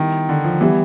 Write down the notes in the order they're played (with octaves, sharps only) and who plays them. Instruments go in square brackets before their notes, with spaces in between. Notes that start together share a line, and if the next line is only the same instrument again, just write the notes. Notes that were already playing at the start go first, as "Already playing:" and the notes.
Already playing: [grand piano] D#3 [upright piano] G3 B3 E4
[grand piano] D3
F3
[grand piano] E3 [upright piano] G3 B3 E4